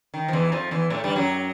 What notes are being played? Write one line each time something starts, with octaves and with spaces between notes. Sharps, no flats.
D#3
F3
E2 E3
F2 F3
E2 E3
A2 A3
G2 G3
F#2 F#3